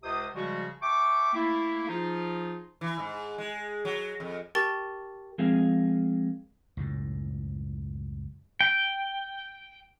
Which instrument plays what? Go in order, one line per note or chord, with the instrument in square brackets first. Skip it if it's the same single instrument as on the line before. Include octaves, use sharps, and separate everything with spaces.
[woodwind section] C#2 C3 C5 D#6
C#3 F3 G3 G#3 F#4
E5 G5 A5 C#6 D6
A3 A#3 E4
F3 D#4 F4 G#4
[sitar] E3
G#2
G#3
F#3
F2
[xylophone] G4 A#4 G5 A5 C#6 A6
[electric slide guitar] F3 G#3 C4 G#4 A#4 F5
[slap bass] C#2 F#2 A2
[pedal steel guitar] G5